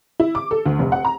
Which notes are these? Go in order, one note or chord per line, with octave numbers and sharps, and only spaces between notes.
E4
D6
A4
D2
F1
F#5
A#5